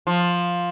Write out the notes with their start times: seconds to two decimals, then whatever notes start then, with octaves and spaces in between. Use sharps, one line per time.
0.07 F3